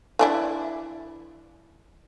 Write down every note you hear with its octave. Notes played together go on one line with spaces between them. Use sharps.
E3 D4 E4